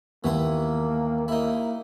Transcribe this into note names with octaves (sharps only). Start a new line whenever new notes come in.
D#2 E3 A#3 B3 C6
A#3 D#4 E4